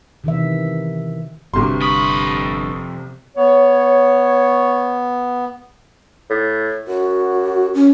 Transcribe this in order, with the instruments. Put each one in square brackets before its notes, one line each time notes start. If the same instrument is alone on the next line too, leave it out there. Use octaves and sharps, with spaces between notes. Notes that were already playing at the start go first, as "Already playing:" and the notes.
[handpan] C3 D#3 E3 E5
[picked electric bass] G1 G2 [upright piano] C2 C3 C6 [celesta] F#4 C#6 F6
[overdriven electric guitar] F2 B5 [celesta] C#6 D#6 F6
[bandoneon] B3 [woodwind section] C#5
[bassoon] A2
[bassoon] F#2 [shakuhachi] F#4
[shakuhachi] C#4